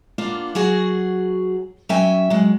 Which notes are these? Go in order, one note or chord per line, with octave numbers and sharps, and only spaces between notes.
A#3 B3 D4 F4
F#3 F#4 G#4
F#3 C#4 E5 G5 G#5
F#3 G#3